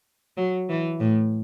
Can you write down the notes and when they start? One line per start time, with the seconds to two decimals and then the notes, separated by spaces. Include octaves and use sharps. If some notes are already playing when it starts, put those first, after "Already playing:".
0.37 F#3
0.69 E3
1.00 A2